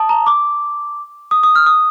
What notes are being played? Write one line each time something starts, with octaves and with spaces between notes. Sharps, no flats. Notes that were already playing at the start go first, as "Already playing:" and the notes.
Already playing: A5 D#6
A#5
D6
D#6
D#6
F6
D#6